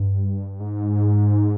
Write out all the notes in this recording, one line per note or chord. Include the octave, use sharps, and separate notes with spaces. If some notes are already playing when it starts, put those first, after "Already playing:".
Already playing: G2
G#2